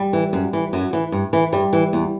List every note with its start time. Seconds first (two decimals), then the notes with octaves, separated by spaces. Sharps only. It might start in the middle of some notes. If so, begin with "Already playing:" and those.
Already playing: G3
0.13 E3
0.33 F#2
0.53 E3
0.73 F#2 F#3
0.93 E3
1.12 G2
1.33 E3
1.53 G2 G3
1.73 E3
1.93 E2